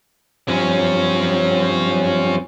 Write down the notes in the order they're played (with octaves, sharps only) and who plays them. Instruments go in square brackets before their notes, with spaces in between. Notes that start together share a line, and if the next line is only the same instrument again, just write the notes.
[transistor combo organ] G2 F3 C4 [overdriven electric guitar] F#3 C#4